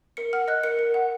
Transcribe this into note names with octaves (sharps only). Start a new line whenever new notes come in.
A#4 C#7
F#5 F6
D#5 F#6
A#4 C#7
A#4
F#5